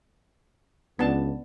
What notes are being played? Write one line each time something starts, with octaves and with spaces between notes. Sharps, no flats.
C#2 B3 D4 A5